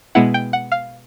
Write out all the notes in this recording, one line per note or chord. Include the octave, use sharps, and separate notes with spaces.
B2 G#3 B3 E4 F#5
G5
F#5
F5